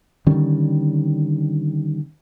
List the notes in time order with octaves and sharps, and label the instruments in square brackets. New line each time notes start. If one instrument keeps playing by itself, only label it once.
[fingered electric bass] D3 D#3 G3 C#4